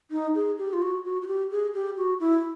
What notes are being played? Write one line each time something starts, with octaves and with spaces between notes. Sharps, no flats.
D#4
G#4
G4
F4
F#4
F#4
F#4
G4
G#4
G4
F#4
E4